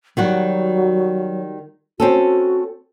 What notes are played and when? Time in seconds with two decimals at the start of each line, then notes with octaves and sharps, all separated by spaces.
0.17 D#3 F#3 G3 F#4
2.00 C4 C#4 F#4 A4